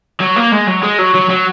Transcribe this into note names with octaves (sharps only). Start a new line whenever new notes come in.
F#3
A#3
G#3
F#3
G#3
F#3
F#3
F#3